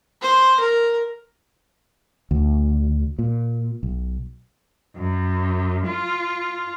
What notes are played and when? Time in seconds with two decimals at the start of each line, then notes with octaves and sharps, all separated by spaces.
0.22 C5
0.60 A#4
2.31 D2
3.19 A#2
3.83 B1
4.96 F#2
5.88 F4